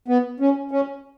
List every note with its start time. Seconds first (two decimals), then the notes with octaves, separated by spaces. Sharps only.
0.08 B3
0.40 C#4
0.71 C#4